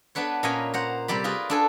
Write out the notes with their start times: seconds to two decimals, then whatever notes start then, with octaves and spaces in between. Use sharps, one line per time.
0.15 B3 D4 B4 C#5
0.43 A#2 C#4 B4 D#5 F5 G#5
0.74 C5 F#5 A#5
1.08 C3 G3 G4 D5 B5
1.24 F4 G#4 A#4 B4
1.50 D4 A4 G#5